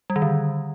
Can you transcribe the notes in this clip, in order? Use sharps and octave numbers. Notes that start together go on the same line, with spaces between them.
G3
D#3
D3